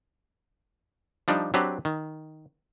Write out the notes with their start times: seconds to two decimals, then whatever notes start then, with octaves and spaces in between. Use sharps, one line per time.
1.28 F3 G3 D4 D#4
1.54 F#3 C4 D4 G4 B4
1.85 D#3